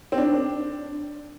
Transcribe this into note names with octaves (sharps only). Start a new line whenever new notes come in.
C4
D4